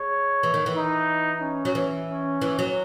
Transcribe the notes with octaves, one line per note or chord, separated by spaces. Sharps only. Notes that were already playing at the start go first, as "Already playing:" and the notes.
Already playing: G#3 C#5
E3
D#3
E3
D#4
C#4
F#3
E3
C#4
E3
F#3